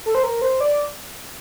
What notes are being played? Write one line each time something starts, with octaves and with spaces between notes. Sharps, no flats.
A4
C5
A#4
C5
D5